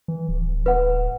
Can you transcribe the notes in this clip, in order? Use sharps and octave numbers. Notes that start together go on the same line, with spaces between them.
E3
D1
B4 F#5